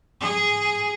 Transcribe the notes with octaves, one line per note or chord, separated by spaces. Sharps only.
G#4